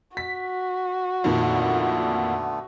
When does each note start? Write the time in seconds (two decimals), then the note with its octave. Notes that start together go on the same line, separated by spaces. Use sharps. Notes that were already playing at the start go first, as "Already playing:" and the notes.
0.17 F#4 B6
1.24 F2 A#2 D3 D#3 A3 B3